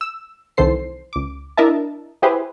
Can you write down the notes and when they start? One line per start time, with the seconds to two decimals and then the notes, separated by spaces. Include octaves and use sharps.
0.01 E6
0.57 C2 D#3 E3 A4 C5 C7
1.13 C#2 D6
1.57 D4 E4 A#4 D#5 E5 A5
2.22 E4 G4 G#4 B4 C5 E5